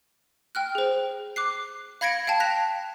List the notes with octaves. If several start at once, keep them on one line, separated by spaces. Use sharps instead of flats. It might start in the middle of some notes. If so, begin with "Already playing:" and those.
G5 F6 F#6
G#4 C5
D6 F#6 C7
F5 B5 G#6 A#6 C#7 D7
F5 G5 A5
F#6 A#6 B6 F7